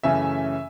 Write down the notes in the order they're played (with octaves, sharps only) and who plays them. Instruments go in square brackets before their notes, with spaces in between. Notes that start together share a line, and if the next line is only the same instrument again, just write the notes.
[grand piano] F#2 C#3 E3 A3 C#4 E5 G#5